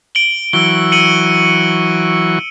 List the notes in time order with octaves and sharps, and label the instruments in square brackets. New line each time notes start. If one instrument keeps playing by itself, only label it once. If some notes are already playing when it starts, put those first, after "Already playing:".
[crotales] D7 F#7 G7
[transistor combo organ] E3 F#3 C#6 [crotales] E6 G7
[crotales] C#7 D#7 F#7